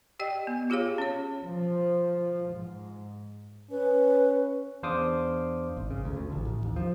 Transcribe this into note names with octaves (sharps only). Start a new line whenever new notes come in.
G4 D5 D#5 G5
B3
F4 G4 G#4 C#5 F5
C#4 C#5
F3
G#2
C#4 B4
E2 D4 C5 F5 D6 D#6
G#1
C#3
D2
D2
A1
A1
D#2
F3